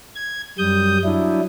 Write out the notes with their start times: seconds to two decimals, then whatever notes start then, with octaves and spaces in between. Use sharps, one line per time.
0.15 G#6
0.58 F#2 G3 D#6 G6
1.04 F#3 D4 E4